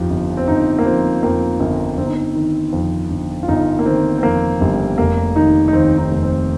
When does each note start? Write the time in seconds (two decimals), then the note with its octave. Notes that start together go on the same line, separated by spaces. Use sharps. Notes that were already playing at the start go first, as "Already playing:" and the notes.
Already playing: G1 F2 F3 D#4 G4
0.10 G1
0.37 C4
0.48 G1 D#4
0.79 A#3
0.85 F3 C4
1.23 F2 A#3
1.60 G1 A#3
1.98 G1 C4
2.07 D#4
2.14 C4
2.35 D#3
2.72 F2
3.10 G1
3.43 F4
3.48 G1 D#4
3.79 A#3
3.86 D#3 C4
4.18 C4
4.23 F2 A#3
4.61 G1 G3
4.98 F1 A#3
5.36 D#3 D#4
5.68 D#4
5.73 D#2 C4
5.98 D#4
6.11 F1
6.23 C4